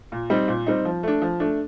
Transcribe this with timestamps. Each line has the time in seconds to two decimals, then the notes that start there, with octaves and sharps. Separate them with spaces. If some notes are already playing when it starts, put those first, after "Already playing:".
0.12 A#2
0.30 G3 C4 D#4
0.48 A#2
0.67 G3 C4 D#4
0.85 F3
1.03 A3 D4
1.22 F3
1.40 A3 D4